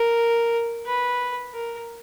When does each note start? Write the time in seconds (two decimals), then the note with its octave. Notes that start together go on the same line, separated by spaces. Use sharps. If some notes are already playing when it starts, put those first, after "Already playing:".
Already playing: A#4
0.86 B4
1.54 A#4